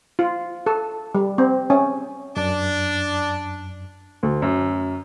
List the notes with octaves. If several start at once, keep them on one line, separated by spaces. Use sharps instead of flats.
F4
A4
G3
C4
C#4
F#2 D4
D2
F#2